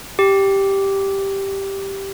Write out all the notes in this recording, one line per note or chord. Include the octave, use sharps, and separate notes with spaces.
G4